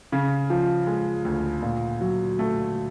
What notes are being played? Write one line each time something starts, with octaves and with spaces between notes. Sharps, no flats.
C#3
F3
G#3
D2
A#2
F#3
A3